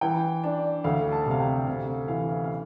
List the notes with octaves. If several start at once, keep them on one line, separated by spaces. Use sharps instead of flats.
E3 G5
D4
D2 F5
A5
C3 F5
G5
C3 F5
F5
E3 F5
F5
F5